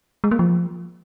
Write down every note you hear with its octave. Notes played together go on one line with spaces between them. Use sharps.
G#3
A#3
F3